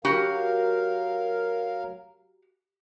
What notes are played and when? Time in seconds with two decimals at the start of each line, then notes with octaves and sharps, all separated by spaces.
0.05 F#3 F#4 G4 A#4 F5